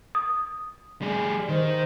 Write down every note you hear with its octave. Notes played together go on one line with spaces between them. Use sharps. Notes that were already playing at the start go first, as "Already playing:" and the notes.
D#6
G3 G#4
D#3 C5